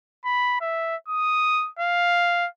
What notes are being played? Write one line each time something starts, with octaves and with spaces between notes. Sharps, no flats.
B5
E5
D#6
F5